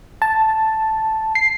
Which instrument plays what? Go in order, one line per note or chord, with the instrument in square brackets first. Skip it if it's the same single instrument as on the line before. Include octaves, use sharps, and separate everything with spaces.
[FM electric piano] A5
C7